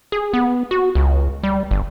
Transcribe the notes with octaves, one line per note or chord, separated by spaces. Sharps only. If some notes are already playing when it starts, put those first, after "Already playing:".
G#4
B3
F#4
C#2
G3
G1